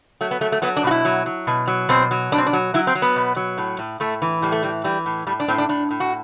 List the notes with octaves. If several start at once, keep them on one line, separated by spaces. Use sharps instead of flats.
F#3 A3
B3
F#3 A3
A3
F#3 B3
D4
B2 F#4
E4
F#3
F#3
B2
F#3
B2 C4
F#3
B2 D4
C4
D4
F#3
F#3 E4
C4
F#3
B3
B2
F#3
A2
A2
A2 A3
E3
A2 G3
A3
E3 G3
E3 G3
A2
A2 G3
D4
A2 C4
D4
A2 D4
A2
F#4